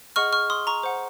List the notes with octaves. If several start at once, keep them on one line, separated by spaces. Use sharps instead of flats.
G#4 D#5 F#5 C#6 F6
C#6 F6
C6 D#6
A#5 C#6
C5 F#5